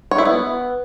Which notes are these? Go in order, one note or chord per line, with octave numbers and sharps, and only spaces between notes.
C#5
E4
B3